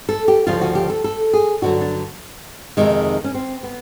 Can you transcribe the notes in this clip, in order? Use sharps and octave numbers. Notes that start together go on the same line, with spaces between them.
A4
G4
D2 C#3 F3 F4
F#4
G4
A4
A4
G#4
G2 D3 F#3 F#4
D4
F2 C3 D#3 G#3
C#4
C4
B3